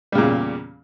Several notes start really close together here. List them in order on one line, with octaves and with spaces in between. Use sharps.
G3 C#3 A#2 E2